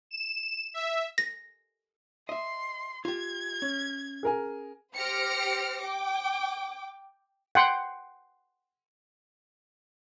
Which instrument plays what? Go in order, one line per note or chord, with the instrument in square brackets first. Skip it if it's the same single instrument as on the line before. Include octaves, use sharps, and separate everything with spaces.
[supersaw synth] E7
E5
[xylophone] A#6
[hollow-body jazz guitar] D#5 E5 [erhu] C6
[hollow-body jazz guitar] F4 G4 [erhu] G#6
[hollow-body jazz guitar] C#4
[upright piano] G#4 A#4 G#5
[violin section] G4 C5 F6 A#6 C#7 D7
G5 D6
[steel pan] F#5 G5 C6